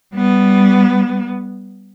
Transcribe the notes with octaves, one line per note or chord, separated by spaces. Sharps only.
G3 B3